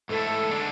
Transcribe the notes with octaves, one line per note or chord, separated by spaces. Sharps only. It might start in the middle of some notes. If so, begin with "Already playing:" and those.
G#2 E3 A3 E4 A4
D3 G#3 D4